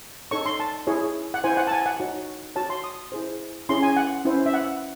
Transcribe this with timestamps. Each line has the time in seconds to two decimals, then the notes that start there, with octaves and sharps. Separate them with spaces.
0.31 D#4 A4 C#5 C#6
0.46 C6
0.60 A5
0.87 E4 G#4 C#5
1.34 F#5
1.44 E4 C5 G#5
1.57 F#5
1.67 A5
1.72 G#5
1.86 F#5
2.00 D#4 F#4 C#5
2.56 F#4 C#5 A5
2.70 C6
2.84 D#6
3.12 E4 G#4 C5
3.69 C#4 E4 G#4 C#5 C6
3.82 G#5
3.96 F#5
4.25 C#4 E4 C5
4.46 E5
4.54 F#5